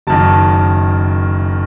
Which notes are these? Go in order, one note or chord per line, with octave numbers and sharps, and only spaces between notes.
F#1 F#2 D#3 A5